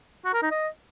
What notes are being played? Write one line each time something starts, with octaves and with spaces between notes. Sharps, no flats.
F#4
A#4
D#4
D#5